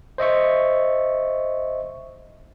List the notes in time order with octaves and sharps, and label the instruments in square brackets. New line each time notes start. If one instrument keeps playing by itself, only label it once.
[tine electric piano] C5 D#5 E5 C#6